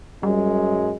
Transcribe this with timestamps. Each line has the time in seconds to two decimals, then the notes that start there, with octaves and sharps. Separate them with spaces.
0.23 F#2 G3 G#3